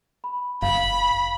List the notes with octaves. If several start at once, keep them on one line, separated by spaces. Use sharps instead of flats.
B5
F#1 F5 B5